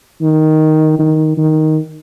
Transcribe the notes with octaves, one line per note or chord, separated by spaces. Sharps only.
D#3
D#3
D#3